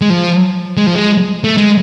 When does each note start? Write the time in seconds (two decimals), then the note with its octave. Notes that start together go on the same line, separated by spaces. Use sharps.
0.01 G#3
0.10 F3
0.77 G#3
0.87 F3
0.95 G#3
1.44 A3
1.57 G#3